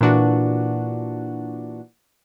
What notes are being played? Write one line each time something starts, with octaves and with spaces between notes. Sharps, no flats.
A#2 E3 D4 F#4